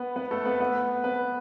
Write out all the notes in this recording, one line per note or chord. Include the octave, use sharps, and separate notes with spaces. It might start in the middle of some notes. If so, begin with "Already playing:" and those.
Already playing: B3 B4
B3 B4
A3 A4
B3 B4
B3 B4
B3 B4